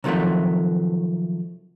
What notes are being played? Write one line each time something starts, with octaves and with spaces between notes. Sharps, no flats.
C3 D#3 F3 F#3 A3